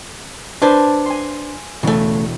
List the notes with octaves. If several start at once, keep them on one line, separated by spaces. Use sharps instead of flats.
D4 B4 C5 A5 G#6 A6
G#5 C6
E1 C#3 A3